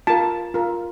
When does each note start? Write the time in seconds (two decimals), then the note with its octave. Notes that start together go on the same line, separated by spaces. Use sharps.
0.07 F4 A#4 A5
0.54 F4 A#4